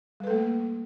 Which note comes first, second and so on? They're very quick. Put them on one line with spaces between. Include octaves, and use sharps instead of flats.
G3 B4 A4 A3 A#3